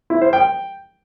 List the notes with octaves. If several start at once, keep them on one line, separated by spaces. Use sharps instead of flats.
E4
C5
G5